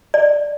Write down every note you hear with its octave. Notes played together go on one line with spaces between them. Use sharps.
D5